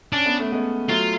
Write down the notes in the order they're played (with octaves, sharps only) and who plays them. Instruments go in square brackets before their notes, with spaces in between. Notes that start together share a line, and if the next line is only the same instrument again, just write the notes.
[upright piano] C#4 [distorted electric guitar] D4
[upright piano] B3
A3
G#3 B3
[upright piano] F#3 A3 [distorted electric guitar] F4